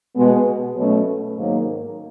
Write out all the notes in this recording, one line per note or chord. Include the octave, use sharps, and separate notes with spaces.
B2 G#3 B3
B2 F#3 A3 C#4
G#2 D#3 F#3 A#3